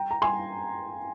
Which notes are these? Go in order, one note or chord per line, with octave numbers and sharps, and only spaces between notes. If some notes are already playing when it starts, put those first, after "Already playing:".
Already playing: G5 A#5
A#5
G#5 C6